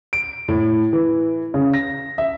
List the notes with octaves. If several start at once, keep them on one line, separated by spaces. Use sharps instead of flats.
D7
A2
E3
C#3
A#6
E5